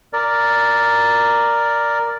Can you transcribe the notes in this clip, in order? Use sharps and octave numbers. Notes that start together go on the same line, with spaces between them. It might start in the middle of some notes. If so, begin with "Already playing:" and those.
A#4 D5